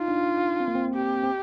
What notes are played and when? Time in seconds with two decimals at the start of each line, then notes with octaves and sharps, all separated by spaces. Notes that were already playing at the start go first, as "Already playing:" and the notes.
Already playing: D#4 F4
0.08 D4
0.60 C4
0.68 A#3
0.75 C4
0.94 G4
1.24 C4